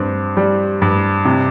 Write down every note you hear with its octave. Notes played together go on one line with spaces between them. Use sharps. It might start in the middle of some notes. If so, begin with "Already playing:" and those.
Already playing: G2 C4
G3
G2
C3